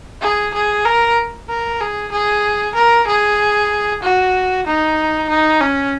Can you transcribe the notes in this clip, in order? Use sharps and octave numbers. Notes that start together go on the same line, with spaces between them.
G#4
G#4
A#4
A#4
G#4
G#4
A#4
G#4
F#4
D#4
D#4
C#4